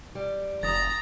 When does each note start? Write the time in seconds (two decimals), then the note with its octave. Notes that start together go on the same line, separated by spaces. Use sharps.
0.15 G3
0.63 F1 A#5 D#6 A6